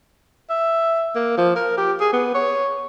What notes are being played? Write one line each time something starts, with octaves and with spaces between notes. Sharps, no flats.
E5
A#3
F3
A#4
G4
G#4
B3
C#5